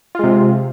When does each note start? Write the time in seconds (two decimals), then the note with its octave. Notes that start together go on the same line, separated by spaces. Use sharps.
0.15 F4
0.19 G#3
0.23 C3